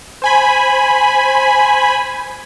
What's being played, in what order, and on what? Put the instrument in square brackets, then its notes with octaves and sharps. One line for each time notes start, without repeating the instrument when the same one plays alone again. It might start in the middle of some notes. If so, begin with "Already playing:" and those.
[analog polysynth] C5 G#5 B5